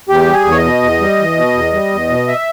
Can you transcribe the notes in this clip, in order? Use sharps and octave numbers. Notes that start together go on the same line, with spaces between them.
E2 G4
G3
G#4
E2
C#5
D#5
B2
E2
G3
E2
B2
E2
G3
E2
B2
E5